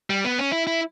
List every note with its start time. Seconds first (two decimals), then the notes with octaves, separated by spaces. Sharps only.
0.10 G3
0.25 B3
0.38 C#4
0.52 E4
0.67 E4